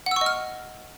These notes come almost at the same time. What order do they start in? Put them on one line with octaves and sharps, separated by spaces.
F#5 E6 C#6 D#5 F6